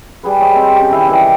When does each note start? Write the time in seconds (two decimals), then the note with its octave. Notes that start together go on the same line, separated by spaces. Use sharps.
0.24 G3 G#4 B4
0.40 B4 C#5 D#5
0.56 C4
0.76 C#4 G4
0.91 D#3 E4 E5 F5
1.08 C3 D#3 E3 G3